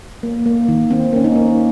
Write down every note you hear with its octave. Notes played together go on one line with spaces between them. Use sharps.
A#3
A#3
D#3
D#3 C4
A#3 C#4
D#4
A#3